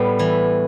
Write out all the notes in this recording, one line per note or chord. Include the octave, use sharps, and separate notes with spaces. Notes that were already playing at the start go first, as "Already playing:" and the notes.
Already playing: A2 G3 B3
E3